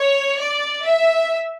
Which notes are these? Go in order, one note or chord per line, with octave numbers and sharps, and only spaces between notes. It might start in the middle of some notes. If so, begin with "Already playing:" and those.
Already playing: C#5
D5
E5